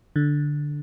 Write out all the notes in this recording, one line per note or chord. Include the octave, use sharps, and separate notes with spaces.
D3